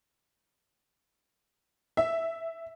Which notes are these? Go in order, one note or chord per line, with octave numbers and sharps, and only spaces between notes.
E5